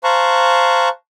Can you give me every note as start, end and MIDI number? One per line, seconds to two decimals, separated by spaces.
0.04 0.89 72
0.04 0.89 77
0.04 0.89 81
0.04 0.89 82
0.04 0.89 85
0.04 0.89 90